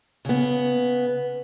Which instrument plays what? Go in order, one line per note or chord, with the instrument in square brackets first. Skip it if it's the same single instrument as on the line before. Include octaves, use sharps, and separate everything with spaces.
[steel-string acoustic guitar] C#3 B3